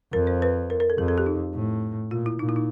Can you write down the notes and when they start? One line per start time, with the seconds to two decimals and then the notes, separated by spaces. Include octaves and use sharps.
0.13 F2 A#4
0.27 C5
0.42 B4
0.70 A#4
0.80 A#4
0.90 A4
0.98 F2 G#4
1.08 A4
1.18 G4
1.26 D#4
1.55 A2
2.11 A#2 F4
2.26 E4
2.39 A#2 D#4
2.49 E4
2.56 D#4